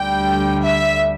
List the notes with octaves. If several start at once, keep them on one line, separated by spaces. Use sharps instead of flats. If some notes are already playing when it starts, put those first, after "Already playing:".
Already playing: D2 D3 G3 G5
E5